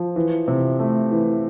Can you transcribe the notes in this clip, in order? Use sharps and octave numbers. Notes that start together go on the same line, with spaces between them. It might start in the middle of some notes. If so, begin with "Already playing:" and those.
Already playing: F3
E3
C3
A3
E3